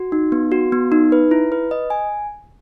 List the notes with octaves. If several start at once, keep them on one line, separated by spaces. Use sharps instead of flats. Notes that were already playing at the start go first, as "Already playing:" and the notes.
Already playing: F#4
D#4
B3
F#4
B3
D#4
B4
E4
B4
D#5
G#5